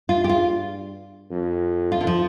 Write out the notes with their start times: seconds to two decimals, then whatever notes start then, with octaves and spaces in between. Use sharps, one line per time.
0.09 G2 F4
0.24 G4
0.29 F4
1.31 F2
1.92 F4
2.01 D3
2.07 F3